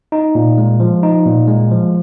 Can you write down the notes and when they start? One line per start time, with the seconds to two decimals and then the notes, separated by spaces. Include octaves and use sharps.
0.12 D#4
0.35 A#2
0.58 G#3
0.80 F3
1.03 D#4
1.26 A#2
1.48 G#3
1.71 F3